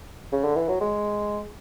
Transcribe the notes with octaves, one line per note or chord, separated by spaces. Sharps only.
C#3
D3
E3
F#3
G#3